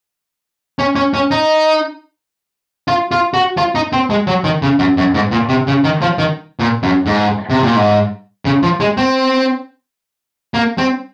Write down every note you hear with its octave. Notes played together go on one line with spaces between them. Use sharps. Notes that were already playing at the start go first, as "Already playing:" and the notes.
C#4
C#4
C#4
D#4
F4
F4
F#4
F4
D#4
C4
G#3
F#3
D#3
C#3
F#2
F#2
G#2
A#2
C3
C#3
D#3
F3
D#3
A#2
F#2
G#2
C3
A#2
G#2
C#3
F3
G#3
C4
A#3
C4